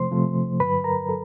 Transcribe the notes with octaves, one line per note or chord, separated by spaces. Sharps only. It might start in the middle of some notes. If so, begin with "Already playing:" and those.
Already playing: C3 F3 A3 C5 C6
C3 F3 A3
G2 D3 F#3 B4 B5
A#4 A#5
F#3 A4